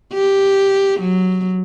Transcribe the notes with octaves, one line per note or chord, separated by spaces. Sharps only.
G4
F#3